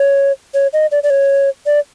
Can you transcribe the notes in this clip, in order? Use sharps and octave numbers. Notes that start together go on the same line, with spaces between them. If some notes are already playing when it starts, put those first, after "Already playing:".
Already playing: C#5
C#5
D#5
D5
D5
C#5
D5